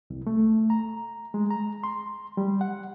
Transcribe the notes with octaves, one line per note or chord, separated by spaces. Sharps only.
C2
A3
A#5
G#3
A#5
C6
G3
F#5